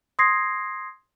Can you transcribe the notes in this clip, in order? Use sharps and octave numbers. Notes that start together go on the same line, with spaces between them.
C6 D#6 G#6 A#6 C7